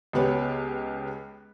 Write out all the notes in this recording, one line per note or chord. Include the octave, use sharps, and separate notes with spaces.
C#2 B3 G4 B4 C#5